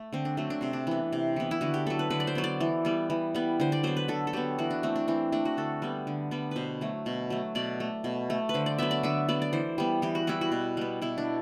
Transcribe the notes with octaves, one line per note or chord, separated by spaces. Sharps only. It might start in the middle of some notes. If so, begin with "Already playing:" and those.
Already playing: A3
D3 C4
D4
F#3 A3 C4
D4
C3 C4
D4
E3 B3
C3
E3 B3
E4
D3 F#4
G4
F#3 B3 A4
B4
D3 B4
D5
C5
F#3 B3
D5
E3
G3 B3
E3
G3 B3
D3 C5
D5
F#3 B3 C5
B4
D3 A4
A4
F#3 B3 G4
E3 F#4
D4
A3 C4
D4
E3 C4
A3 D4
F#4
D3 A4
G3 B3
D3
G3 B3
B2 B4 C5
F#3 A3
B2
F#3 A3
B2 D5
A3
B2
A3
B4
D3 C5
D5
F#3 B3 E5
D5
D3 E5
F#3 B3 D5
D5
E3 C5
G3 B3
E3 G4
F#4
G3 B3 E4
F#4
B2
G3 B3
B2 E4
D4